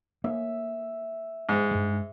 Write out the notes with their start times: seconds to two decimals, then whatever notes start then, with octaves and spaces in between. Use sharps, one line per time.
0.24 A#3 E5
1.49 G#2
1.71 G2 G#3